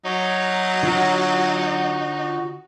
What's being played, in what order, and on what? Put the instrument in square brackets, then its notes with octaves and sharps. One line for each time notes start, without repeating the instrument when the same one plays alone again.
[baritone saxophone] F#3 [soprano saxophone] D#4 [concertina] C#5
[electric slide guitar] D3 F4 C#5 [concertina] F#4